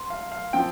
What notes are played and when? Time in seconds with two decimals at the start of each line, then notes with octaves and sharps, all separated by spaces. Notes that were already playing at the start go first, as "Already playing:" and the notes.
Already playing: C6
0.10 F5
0.32 F5
0.53 F3 C4 G5